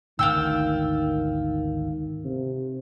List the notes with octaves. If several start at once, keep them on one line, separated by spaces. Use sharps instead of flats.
G#1 D2 G#2 D#3 F4 G5 E6
C3